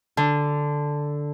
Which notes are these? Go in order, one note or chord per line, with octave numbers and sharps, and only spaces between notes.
D3